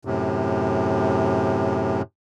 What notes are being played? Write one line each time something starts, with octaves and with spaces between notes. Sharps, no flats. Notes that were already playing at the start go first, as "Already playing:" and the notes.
F#2 A2 C3